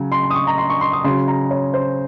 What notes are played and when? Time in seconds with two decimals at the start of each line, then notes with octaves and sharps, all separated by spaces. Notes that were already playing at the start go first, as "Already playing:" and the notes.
Already playing: C#3 F#3
0.12 C6
0.23 C6
0.30 D#6
0.35 C#6
0.47 A#5
0.58 C6
0.70 C#6
0.81 C6
0.93 D#6
1.04 C#3 F#3 C6
1.28 A#5
1.51 C#5
1.74 C5